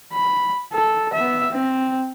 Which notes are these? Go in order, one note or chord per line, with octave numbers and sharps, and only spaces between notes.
B5
A4
B3 E5
C4